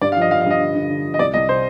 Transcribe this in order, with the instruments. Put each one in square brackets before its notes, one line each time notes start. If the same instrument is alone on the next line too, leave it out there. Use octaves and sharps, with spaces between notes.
[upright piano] G2 [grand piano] D5
[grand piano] F5
[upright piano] F3 [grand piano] D#5
[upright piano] F3 [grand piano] F5
[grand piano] F5
[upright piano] G2 [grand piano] D#5
[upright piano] D3
D3
D3
F3
[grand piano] D#5
[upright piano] C2 [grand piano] D5
[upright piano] C2 [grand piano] D#5
[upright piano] C3 [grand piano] C5